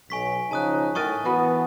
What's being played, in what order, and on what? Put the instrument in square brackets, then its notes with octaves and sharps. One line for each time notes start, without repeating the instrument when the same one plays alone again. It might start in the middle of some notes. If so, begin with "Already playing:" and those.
[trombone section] B1 [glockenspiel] G#5 C#6 B6
[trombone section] C#3 F3 D#4 [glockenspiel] A5 D#6 F#6
[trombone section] A2 [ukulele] D#4 A#4 G#5 [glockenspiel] C#6 D#6 A6
[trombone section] E3 B3 [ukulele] F#4 B4